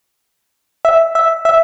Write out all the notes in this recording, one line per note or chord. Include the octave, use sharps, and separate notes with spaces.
E5
E5
E5